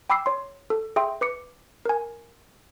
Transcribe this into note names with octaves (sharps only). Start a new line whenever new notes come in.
G5 B5 D6 E6 C7
C#5 C6
A4
G#4 E5 G5 C6
B4 D6 C#7
A#4 G#5